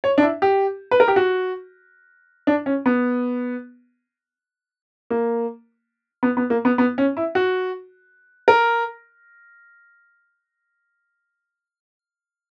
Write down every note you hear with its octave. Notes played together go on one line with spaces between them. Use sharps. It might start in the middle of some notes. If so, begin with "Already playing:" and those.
C#5
D4
E4
G4
B4
A#4
G4
F#4
D4
C#4
B3
A#3
B3
B3
A#3
B3
B3
C#4
E4
F#4
A#4